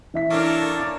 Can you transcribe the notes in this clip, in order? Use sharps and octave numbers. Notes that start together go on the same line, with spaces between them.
E3 E5 B6
A#3 D4 A4 A#4 C#5
D6 A6